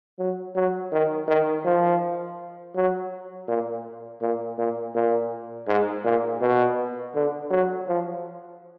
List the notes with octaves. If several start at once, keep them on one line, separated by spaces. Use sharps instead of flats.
F#3
F#3
D#3
D#3
F3
F#3
A#2
A#2
A#2
A#2
G#2
A#2
B2
D3
F#3
F3